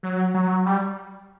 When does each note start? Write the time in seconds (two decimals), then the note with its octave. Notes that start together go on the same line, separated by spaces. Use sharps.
0.03 F#3
0.34 F#3
0.66 G3